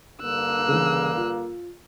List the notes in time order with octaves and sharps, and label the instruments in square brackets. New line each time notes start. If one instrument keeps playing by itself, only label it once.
[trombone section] G2 D3 A#3 [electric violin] E6 F#6
[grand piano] C#3 E3
F4